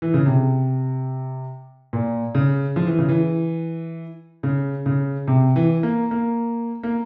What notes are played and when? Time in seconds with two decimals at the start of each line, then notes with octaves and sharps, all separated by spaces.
0.02 E3
0.14 C#3
0.26 C3
1.93 A#2
2.35 C#3
2.76 F3
2.87 E3
2.98 C#3
3.09 E3
4.43 C#3
4.86 C#3
5.27 C3
5.56 E3
5.83 A#3
6.11 A#3
6.83 A#3